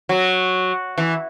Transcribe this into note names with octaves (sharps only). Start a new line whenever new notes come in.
F#3
E3